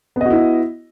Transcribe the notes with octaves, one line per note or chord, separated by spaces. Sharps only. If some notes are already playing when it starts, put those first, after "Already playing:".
B3 E4 F#4 D#5